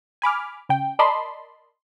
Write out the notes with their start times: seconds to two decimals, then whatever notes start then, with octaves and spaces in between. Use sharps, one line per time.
0.22 G#5 B5 D6 F6
0.69 C#3 G5
0.99 A#4 D5 D#5 A5 B5 C6